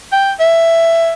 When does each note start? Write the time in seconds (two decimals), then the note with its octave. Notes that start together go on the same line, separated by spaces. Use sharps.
0.12 G5
0.40 E5